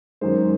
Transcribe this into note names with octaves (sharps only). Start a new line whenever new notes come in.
F#2 D#3 G#3 C5